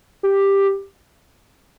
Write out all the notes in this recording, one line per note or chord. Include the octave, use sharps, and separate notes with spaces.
G4